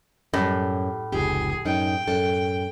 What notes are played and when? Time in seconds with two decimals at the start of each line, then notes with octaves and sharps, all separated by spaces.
0.33 F#2 A2 G3
1.12 F1 C#2 G4 G#4
1.65 F#2 D#4 G5
2.08 F#2 A4